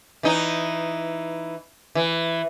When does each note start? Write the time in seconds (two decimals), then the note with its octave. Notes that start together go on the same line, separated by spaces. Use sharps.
0.23 E3 D#4
1.95 E3